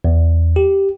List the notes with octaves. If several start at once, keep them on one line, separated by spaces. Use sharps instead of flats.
E2
G4